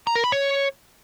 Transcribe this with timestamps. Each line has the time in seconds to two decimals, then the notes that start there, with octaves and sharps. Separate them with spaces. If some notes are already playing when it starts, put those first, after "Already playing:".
0.07 A#5
0.15 A#4
0.24 B5
0.32 C#5